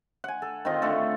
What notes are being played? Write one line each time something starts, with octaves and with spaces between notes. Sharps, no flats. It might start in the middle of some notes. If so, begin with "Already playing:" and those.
F#5 G#5
A4
D#3 C4 F4 D#5
D3 A3 A4